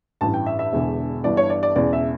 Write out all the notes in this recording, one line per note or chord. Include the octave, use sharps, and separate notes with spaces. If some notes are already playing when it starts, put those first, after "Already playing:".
A1 G2 E3 A5
G5
E5
E5
E1 E2 D3
G1 G2 E3 D5
C#5
D5
D5
E1 E2 C#3 E3 D5
E5